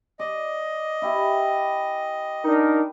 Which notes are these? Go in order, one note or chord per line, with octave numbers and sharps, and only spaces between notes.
D5 D#5
E4 G4 G#5
D4 D#4 A#4